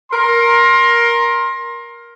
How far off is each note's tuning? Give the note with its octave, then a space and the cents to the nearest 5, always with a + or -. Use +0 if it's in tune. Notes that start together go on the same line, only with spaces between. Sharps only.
A#4 +10 C6 +25